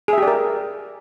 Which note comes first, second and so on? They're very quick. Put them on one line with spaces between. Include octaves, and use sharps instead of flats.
G#4 E5 G4 D5 A#4